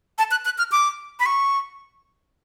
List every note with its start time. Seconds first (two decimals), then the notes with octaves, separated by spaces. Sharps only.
0.19 A5
0.31 F#6
0.45 F#6
0.58 F6
0.72 D6
1.20 B5
1.26 C#6